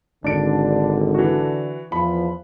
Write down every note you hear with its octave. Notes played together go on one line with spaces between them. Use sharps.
G#1 D3 D4 D7
E3 F#4
E2 F3 B5